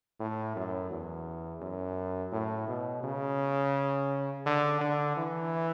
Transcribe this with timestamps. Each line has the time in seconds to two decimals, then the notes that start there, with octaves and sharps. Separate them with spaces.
0.20 A2
0.56 F#2
0.91 E2
1.61 F#2
2.32 A2
2.68 B2
3.03 C#3
4.46 D3
4.80 D3
5.17 E3